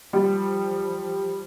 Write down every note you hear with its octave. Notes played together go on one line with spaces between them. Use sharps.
F3 G3